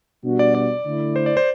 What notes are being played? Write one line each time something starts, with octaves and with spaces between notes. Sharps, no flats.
B2 G3 D4 F#4
D5
D5
D3 A3 E4
C5
D5
C5